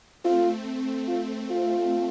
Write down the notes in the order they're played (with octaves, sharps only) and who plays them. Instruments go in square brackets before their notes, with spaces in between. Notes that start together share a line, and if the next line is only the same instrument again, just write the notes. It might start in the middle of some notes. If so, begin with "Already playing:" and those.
[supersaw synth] A3 C4 [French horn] F4
[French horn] F4
F4